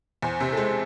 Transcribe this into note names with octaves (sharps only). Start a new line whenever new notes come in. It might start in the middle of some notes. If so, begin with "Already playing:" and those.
E2 C5
C3 C5
A4
G#3 C5